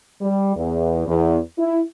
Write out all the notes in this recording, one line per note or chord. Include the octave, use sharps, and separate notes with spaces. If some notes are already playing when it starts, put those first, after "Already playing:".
G3
E2
E2
E4